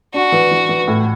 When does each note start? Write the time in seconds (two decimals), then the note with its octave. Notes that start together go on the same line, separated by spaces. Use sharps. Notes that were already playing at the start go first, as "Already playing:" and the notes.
0.14 D4 F#4
0.32 E3
0.51 E3
0.69 E3
0.88 A2